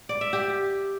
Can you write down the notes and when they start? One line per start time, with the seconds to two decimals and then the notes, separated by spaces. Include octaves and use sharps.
0.09 D5
0.21 E5
0.33 G4